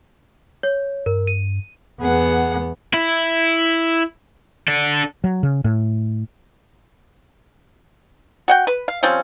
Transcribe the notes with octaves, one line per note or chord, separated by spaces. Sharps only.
C#5
G2 A#4
D#7
E2 B3 G#4 F#5
E4
D4 A4
F#3
C#3
A2
F#4 F#5 G5
B4
F5
F3 G3 C4 C#4